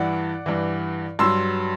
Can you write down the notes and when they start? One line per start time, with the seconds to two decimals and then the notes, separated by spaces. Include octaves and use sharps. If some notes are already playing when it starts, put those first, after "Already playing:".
Already playing: G2 E3 D5 F#5
0.46 G2 E3
1.19 G2 F#3 C6 E6